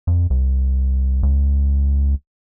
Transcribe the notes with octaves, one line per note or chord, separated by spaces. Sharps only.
F2
C2
C#2